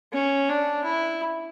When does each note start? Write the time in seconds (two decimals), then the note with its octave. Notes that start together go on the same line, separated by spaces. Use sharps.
0.12 C#4
0.49 D4
0.84 E4